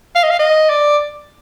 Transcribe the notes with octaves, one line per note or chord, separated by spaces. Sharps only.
F5
D#5
F5
D#5
D5